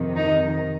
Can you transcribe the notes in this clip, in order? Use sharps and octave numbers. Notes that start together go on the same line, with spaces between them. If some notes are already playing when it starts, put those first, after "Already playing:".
Already playing: F2 C3 D#3
D#4